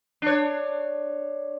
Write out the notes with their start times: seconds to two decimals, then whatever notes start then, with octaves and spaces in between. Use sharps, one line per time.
0.22 D4 C#5